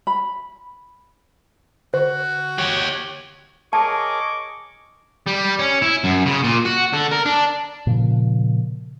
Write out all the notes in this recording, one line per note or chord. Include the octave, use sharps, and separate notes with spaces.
B5
D3 F#4 C5 C#6
G4 C#5
G#4 A#4 C#5 D#5 A5 C#6 D6
G3
C#4
E4
F#2
C#3
A#2
F#4
D3
A#4
D4
A#2 C#3 F3